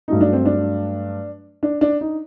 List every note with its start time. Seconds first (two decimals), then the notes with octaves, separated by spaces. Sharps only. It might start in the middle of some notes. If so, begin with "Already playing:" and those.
0.08 G2 F#3 A3 D#4
0.21 D4
0.33 C4
0.45 D4
1.63 D4
1.81 D4
2.01 D#4